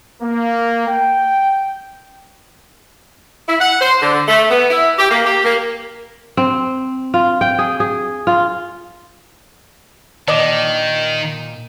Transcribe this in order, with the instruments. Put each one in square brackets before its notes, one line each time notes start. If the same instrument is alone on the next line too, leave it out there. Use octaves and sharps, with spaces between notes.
[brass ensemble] A#3
G5
[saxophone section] E4
F#5
C5
D3
A3
B3
E4
G4
A#3
G4
A#3
[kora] C4
F4
G5
G#4
G#4
F4
[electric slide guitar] A#2 A5 [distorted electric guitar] D#3 [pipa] D5 D#5